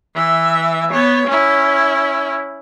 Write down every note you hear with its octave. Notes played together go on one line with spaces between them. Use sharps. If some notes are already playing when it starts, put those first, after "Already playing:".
E3 E5
B3 C#5
C#4 E4